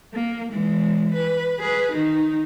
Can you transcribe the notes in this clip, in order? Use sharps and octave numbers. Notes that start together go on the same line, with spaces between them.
A#3
E3 G#3
B4
G#4 B4
D#3 D#4